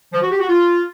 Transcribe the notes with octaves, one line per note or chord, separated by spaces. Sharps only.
F3
F#4
G4
F#4
F4